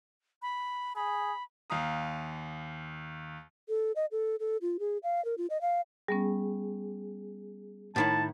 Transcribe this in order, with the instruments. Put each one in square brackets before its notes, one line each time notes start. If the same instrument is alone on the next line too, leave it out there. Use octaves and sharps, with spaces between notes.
[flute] B5
[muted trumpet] G#4 [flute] B5
[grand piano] D#2 F5 A#5 D#6
[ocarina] A4
D#5
A4
A4
F4
G#4
F5
A#4
F4
D#5
F5
[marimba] G3 B3 C#4 [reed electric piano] G#4
[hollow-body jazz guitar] A2 D#3 E4 [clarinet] A5